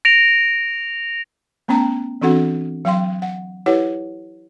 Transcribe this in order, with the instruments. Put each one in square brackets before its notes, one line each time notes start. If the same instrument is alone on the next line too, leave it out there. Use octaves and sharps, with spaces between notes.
[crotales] A#6 D7 F7
[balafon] A3 B3 C#4 G5 A#5
E3 C4 D4 F#4 A4 F#5
F#3 F5 G5 C6
F#5
E4 G4 B4 C#5 F#5